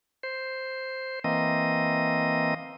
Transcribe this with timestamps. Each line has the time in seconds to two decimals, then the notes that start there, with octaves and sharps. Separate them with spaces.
0.23 C5
1.24 E3 A#3 C4 D#5